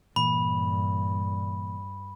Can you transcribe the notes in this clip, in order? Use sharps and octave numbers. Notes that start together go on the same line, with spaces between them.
G2 A#2 E3 B5